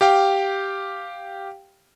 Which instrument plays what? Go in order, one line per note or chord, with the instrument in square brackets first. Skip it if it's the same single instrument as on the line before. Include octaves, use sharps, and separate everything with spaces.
[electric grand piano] G4 F5 G5